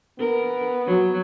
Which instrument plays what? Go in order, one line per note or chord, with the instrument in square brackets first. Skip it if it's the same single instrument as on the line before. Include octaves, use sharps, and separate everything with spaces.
[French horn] B3 [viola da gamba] A#4
[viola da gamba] F#3